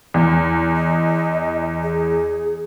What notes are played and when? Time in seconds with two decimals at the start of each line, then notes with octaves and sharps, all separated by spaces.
0.14 E2
0.76 D#5
1.83 G#4